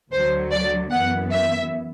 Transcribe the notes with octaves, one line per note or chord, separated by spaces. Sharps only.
D2 D3 F#3 C5
D5
F#2 E3 B3 F#5
E5